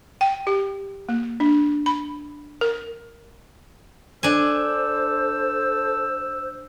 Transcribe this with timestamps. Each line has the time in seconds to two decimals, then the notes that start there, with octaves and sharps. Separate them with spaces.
0.21 G5
0.47 G4
1.09 A#3
1.40 D4
1.86 B5
2.61 A#4
4.23 D4 A4 C5 G#5 E6